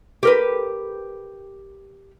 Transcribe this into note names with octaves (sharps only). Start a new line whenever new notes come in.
G4 A#4 B4